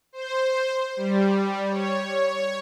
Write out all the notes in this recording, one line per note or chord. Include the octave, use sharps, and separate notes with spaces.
C5
G3
C#5